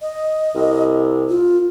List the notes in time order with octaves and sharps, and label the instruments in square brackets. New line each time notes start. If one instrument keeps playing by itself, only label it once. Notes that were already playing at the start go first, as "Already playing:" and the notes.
[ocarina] D#5
[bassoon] C2
[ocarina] F4